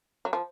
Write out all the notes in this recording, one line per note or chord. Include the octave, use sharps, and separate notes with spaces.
F#3
F3